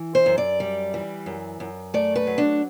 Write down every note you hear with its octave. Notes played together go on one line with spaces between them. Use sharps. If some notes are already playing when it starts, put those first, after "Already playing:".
Already playing: E3
C5
F#2
D5
G3
E3
F#2
F#2
A3 D5
B4
F#3
D4